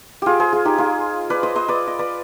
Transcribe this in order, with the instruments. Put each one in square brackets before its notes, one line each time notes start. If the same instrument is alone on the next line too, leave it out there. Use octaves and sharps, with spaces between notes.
[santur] F4 G4 G#4
G#4 C5
F4 G#4
D#4 G4
F4 G#4
B4 D5
C5 D#5
C5 D#5
B4 D5
D#5
B4 D5